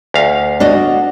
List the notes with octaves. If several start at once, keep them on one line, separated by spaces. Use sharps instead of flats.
D2 F5
D4 F#4 D#5